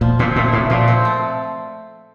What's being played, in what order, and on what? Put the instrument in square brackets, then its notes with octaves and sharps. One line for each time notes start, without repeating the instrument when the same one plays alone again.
[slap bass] A#2 [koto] F3
[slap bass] A#2 [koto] C4
[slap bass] A#2 [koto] A3
[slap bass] A2 [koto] C#3
[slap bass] A#2 [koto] F3
[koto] C4
A3